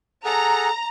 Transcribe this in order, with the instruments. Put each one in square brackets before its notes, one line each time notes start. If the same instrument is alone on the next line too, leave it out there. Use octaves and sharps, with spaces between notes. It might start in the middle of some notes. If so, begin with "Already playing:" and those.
[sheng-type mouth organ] G#4 A4 F#5 [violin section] A#5